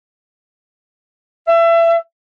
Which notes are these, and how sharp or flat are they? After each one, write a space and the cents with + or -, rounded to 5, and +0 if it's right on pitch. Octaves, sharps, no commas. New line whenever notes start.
E5 +25